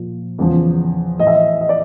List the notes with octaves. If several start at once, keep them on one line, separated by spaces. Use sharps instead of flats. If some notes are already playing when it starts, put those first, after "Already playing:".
Already playing: A#2 F3
E2 C#3 F3
A2 E3 D#5
E5
D#5
D#5
D5